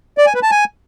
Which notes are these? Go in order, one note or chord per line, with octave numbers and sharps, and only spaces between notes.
D5
G#5
B4
A5
G#5